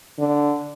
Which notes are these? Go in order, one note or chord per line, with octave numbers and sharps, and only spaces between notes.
D3